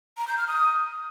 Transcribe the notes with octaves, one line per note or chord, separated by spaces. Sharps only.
A#5
G6
F6
D#6